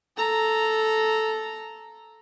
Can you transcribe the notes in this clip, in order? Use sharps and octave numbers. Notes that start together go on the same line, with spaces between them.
A4 A#5